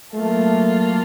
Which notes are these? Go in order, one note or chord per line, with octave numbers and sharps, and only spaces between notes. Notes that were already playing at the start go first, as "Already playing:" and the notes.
F#3 A3 A#3 F4 A4